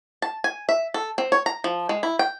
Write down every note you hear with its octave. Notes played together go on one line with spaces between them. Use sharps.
A5
G#5
E5
A4
C4
C#5
A#5
F3
G#3
E4
G5